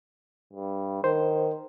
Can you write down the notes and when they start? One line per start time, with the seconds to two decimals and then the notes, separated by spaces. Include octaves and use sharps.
0.53 G2
1.04 D#3 C5